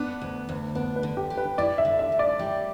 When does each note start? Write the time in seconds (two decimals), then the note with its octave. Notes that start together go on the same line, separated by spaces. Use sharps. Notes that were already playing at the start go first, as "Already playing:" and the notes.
Already playing: B3 D4
0.21 D2
0.49 D2
0.75 B3 D4
0.96 B4
1.03 D3
1.17 G4
1.30 G4
1.37 B4
1.58 E4 D5
1.78 E5
1.85 D3
1.99 E5
2.12 D3
2.19 D5
2.39 G3